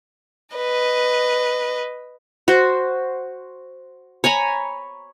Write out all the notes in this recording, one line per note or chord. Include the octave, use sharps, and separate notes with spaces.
B4 D#5
F#4 C5
C#5 G#5 A#5 B5